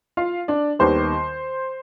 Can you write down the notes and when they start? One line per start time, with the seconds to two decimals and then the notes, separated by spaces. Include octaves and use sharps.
0.17 F4 F5
0.48 D4 D5
0.79 D#2 D#3 G3 B3 C5